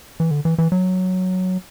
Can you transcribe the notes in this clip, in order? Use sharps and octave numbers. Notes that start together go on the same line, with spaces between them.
E3
D3
E3
E3
F#3